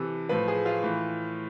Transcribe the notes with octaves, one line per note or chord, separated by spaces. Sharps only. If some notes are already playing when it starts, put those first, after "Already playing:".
Already playing: C3 E3 A4
A2 F3 B4
G#4
F4
A2 E3